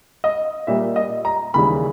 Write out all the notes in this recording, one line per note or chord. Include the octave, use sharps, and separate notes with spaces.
D#5
A#2 G3 A#3 E5
D#5
A#5
D#2 C#3 E3 G3 B5